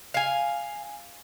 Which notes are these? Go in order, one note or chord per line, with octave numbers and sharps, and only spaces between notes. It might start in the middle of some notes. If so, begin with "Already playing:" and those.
F5 G#5